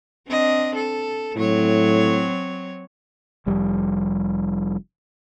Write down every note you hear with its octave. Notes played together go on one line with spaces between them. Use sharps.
C4 D4 D#5
A4
A2 F#3 C4 C#5
F1 F2 G3